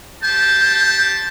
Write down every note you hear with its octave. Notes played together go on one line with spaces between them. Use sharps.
G4 C5 A5 G6